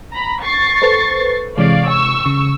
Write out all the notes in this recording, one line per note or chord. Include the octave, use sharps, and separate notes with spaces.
A#5 B5
C#6 A6 C7
A4 B4 C5
C3 E3 G#3 C#5 D5 F5
C#6 E6
C#3